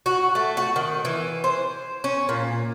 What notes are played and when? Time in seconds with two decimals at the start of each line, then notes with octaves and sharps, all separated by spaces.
0.06 F#4
0.35 A3
0.57 F#4
0.76 D#3
1.05 E3
1.44 C5
2.04 C#4
2.29 A#2